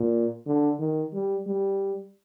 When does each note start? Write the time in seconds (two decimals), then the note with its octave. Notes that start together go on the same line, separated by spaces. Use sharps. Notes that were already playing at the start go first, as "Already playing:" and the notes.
Already playing: A#2
0.46 D3
0.80 D#3
1.13 G3
1.47 G3